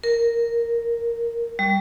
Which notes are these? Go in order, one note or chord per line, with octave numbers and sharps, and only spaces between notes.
A#4
G3